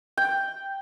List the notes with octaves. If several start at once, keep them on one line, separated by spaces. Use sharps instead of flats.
G5